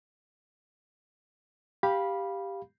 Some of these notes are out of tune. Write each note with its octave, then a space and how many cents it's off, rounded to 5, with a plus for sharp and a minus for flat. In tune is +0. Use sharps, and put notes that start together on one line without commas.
G4 +5 F5 +0 B5 -15